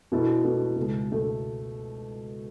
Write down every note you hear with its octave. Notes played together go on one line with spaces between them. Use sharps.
B2 A3 E4 A4
B2 A3 E4 A4
C#2 B2 A3
B2 A3